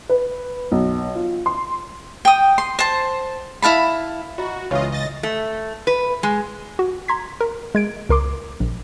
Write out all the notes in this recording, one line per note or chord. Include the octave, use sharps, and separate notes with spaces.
B4
B1
F4
C6
G5 D#6
C6
C5 A5
E4 F5 A5 B5
F4 F#4 D#5 A#5
C#2 E3 F4 C#5 D#5 C#6
D#5 E5 A6 A#6
A3
B4
G#3
F#4
A#5 C6 G#6 B6
A#4
G#3 G#6 D7
C#2 A#4 C6 D6
A#1